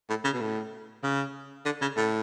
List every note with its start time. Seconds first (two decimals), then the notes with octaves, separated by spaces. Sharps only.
0.09 A2
0.24 C#3
0.33 B2
0.41 A2
1.03 C#3
1.65 D3
1.81 C#3
1.97 A2